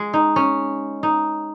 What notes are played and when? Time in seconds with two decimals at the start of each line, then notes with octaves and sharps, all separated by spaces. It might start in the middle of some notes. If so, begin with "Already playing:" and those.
Already playing: G#3
0.14 D#4
0.36 C#4
1.03 D#4